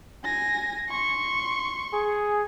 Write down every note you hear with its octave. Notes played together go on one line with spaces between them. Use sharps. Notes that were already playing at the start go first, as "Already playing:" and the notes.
G#5 A#6
C6 C#6
G#4